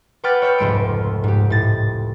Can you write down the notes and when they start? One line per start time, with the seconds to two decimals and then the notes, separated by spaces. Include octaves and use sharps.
0.24 B4 F#5 G5 D6 F6 A6
0.42 C#5 E5 F6 G6
0.58 F1 C#2 G#2 A3 C6 D7
1.24 G#2 G4
1.50 A2 A6